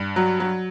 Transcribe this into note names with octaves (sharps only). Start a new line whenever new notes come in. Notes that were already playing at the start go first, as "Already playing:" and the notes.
Already playing: G2
F#3
F#3